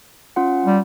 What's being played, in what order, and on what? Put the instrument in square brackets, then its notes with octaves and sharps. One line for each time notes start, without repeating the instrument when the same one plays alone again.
[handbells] C#4 F4 F#5
[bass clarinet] G3